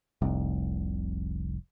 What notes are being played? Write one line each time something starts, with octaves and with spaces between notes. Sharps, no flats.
F1 C2